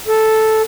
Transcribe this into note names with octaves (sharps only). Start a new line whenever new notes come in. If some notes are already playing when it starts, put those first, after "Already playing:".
A4